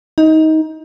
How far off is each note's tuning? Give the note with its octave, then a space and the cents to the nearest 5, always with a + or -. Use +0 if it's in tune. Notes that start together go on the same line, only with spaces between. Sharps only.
D#4 +20